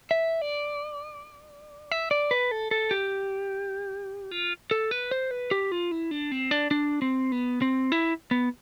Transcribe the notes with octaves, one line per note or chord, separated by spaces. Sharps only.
E5
D5
E5
D5
B4
A4
A4
G4
F4
A4
B4
C5
B4
G4
F4
E4
D4
C4
D4
D4
C4
B3
C4
E4
B3